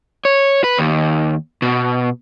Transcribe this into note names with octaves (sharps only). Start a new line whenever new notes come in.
C#5
B4
D#2
B2